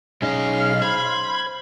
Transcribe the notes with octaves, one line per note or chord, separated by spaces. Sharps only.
B1 C#4 D#4 G#4 D#5 F5
C5 B5 G#6